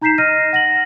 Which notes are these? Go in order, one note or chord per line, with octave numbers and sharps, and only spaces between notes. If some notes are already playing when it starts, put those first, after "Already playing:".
D#4 A#5 G6 B6 C7 E7
D#5 F6 A#6 D#7
F#5 A#6 F#7